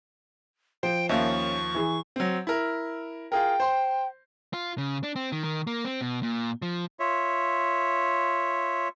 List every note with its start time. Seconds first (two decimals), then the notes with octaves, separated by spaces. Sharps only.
0.83 F3 C5 G5
1.09 D#2 F3 A#3 C#4 E5 F5 C#6
1.75 E3 G#4
2.16 F#3 C4
2.47 E4 A#4
3.32 F4 G#4 A#4 G5
3.60 C5 C6
4.53 F4
4.78 C#3
5.03 D4
5.16 C4
5.32 D#3
5.44 D#3
5.67 A#3
5.85 C4
6.01 B2
6.23 A#2
6.62 F3
7.00 F4 C#5 E5